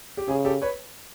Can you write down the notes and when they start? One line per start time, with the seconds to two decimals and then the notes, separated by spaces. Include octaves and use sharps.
0.17 G4
0.28 C#3 G#4
0.45 G4 A4
0.62 B4 C#5